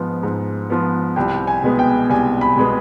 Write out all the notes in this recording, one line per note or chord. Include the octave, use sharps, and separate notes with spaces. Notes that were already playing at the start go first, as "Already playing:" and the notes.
Already playing: G#2 F3 B3
G#2
F3 B3
C2 G5
G#5
B2 G#3 B3
G5
C2 G#5
B5
B2 G#3 B3